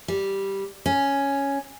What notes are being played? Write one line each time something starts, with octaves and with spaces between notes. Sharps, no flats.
G3
C#4